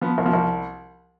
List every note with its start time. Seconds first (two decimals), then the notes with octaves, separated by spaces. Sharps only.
0.01 F3 B3
0.18 C2
0.26 F3
0.33 C2